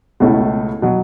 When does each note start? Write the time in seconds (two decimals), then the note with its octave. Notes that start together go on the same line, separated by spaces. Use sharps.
0.20 C#2 B2 A3 C#4 E4
0.82 B2 F#3